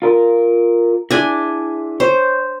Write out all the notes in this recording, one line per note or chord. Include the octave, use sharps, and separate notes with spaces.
F4 A#4
D4 E4 G#4 G#5
C5 C#5